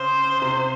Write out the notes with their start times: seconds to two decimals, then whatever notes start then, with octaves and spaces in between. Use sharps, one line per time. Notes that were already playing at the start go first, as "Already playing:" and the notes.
Already playing: C#3 C5
0.42 C3